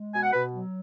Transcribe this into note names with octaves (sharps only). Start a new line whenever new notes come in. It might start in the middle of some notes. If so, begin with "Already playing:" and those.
Already playing: G#3
B2 G#5
F#5
B2 B4
F#3